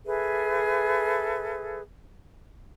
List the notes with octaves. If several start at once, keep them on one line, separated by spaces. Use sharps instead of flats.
G#4 A4 B4 E5